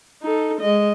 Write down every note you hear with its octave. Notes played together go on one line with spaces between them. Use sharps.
D#4 A4
G#3 D#5